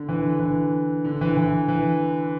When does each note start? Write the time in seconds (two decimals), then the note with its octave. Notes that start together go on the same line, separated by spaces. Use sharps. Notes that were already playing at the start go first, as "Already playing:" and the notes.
Already playing: D3
0.09 E3
0.25 D3
0.40 E3
1.04 D3
1.21 E3
1.37 E3
1.68 E3